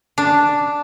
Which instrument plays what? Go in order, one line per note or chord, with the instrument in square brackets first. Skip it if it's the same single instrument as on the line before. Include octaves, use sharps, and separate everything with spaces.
[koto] D4